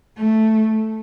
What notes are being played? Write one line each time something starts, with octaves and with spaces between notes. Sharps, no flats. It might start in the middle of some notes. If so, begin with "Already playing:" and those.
A3